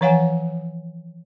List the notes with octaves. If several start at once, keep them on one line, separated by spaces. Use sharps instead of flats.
E3 F3 C#5 F5 F#5 G#5